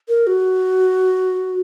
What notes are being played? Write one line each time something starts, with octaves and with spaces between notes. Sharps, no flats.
A#4
F#4